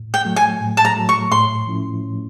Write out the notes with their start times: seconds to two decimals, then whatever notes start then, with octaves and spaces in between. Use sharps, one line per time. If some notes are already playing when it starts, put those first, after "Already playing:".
Already playing: A2
0.14 G5
0.25 F#3 A3
0.36 G#5
0.61 A2
0.77 A5
0.85 A#5
0.96 F#3 A3
1.09 C#6
1.32 A2 C6
1.67 F3 A3 C#4 E4
2.03 A2